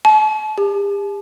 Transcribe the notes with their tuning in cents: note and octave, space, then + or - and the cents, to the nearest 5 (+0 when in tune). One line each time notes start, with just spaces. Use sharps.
A5 -40
G4 +40